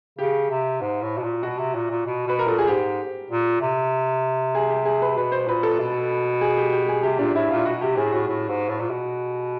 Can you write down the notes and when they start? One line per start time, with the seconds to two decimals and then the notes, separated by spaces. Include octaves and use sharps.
0.19 C#3 G4
0.50 C3
0.81 G#2
1.02 A2
1.18 B2
1.23 A#2
1.43 B2 F#4
1.59 C3
1.75 A#2
1.90 A#2
2.06 B2
2.27 B2 B4
2.39 A#4
2.47 A#2 A4
2.58 G#4
2.67 G#2 G4
3.31 A#2
3.61 C3
4.55 G#4
4.70 G4
4.85 G#4
5.02 B4
5.16 B2 B4
5.32 C5
5.47 A#2 B4
5.63 A4
5.80 B2
6.41 G#4
6.57 G4
6.72 G4
6.88 G#4
7.03 C3 G4
7.19 A#2 D4
7.35 A2 E4
7.51 A#2 F4
7.66 B2 F#4
7.81 C3 G4
7.97 A2 G#4
8.12 A2 F#4
8.28 A2
8.48 G#2
8.69 A2
8.80 A#2
8.90 B2